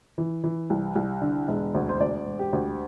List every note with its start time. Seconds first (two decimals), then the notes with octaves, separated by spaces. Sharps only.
0.18 E3
0.44 E3
0.70 C2
0.96 C2
1.22 D3
1.48 E1
1.74 D2
1.89 C5
2.00 D2 D5
2.26 E1
2.39 G4
2.53 D2